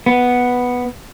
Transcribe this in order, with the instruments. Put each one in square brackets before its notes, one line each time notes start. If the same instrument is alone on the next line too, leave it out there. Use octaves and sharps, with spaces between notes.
[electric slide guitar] B3